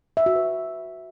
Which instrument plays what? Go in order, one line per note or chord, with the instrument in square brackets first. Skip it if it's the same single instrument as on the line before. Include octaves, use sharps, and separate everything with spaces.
[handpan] E5
F#4
B4